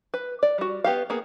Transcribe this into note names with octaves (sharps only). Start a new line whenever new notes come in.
B4
D5
G3 F#4
B3 G4 F5
A#3 B3 G#4